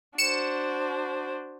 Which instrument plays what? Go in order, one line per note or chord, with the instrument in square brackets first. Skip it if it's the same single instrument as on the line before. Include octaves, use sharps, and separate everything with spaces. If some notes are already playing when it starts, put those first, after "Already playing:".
[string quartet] D4 F#4 C5 [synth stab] C#7 E7